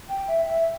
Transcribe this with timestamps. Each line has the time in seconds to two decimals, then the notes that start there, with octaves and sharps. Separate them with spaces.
0.09 G5
0.28 E5
0.47 E5